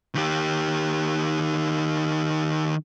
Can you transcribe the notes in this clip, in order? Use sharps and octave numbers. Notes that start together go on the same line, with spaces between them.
D#3 G4